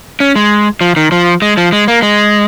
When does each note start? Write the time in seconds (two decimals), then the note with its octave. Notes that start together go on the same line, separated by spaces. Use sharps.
0.20 C#4
0.36 G#3
0.81 F3
0.96 D#3
1.12 F3
1.42 G#3
1.57 F3
1.73 G#3
1.88 A#3
2.02 G#3